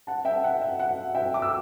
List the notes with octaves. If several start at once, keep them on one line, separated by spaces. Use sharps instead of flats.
F#5 A5
E5 G5
F#5
E5
F#5
E5 G5
D6
E6